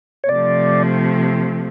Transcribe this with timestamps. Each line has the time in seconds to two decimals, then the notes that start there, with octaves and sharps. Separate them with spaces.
0.24 C#5
0.29 C3 F3 A3 D5